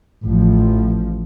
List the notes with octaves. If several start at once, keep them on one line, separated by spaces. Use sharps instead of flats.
A1 F3